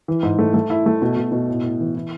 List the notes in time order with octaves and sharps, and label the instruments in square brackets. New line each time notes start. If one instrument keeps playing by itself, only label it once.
[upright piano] E3
G#2
A3
A3
E4
A3
B2
B2
B2
A2
A2
E3
E4